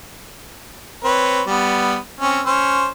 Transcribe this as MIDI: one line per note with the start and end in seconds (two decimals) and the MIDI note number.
1.04 1.42 60
1.04 1.42 71
1.04 1.42 73
1.47 1.97 55
1.47 1.97 59
2.20 2.41 60
2.20 2.41 61
2.46 2.88 61
2.46 2.88 72